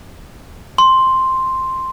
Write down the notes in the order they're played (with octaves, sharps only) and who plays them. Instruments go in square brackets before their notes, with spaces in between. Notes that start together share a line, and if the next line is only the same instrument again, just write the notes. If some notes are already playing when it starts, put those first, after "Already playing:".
[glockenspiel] C6